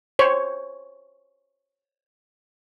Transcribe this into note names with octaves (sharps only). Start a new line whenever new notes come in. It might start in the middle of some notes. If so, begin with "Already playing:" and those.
C5 C#5